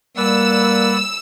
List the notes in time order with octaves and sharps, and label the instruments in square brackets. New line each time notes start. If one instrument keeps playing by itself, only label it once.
[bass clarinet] G3 [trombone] A#3 [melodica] B4 D5 F#5 [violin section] E6